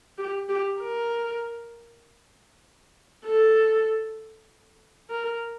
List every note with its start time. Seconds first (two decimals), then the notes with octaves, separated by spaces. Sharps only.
0.18 G4
0.49 G4
0.79 A#4
3.25 A4
5.10 A#4